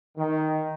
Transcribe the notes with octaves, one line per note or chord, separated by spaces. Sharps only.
D#3